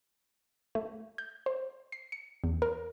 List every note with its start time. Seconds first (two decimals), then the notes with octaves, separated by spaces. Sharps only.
0.75 A3
1.18 G6
1.46 C5
1.92 C7
2.12 C#7
2.44 E2
2.62 A#4